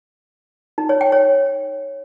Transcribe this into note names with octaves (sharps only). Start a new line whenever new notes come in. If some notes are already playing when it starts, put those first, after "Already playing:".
D#4
C#5
G5
C#5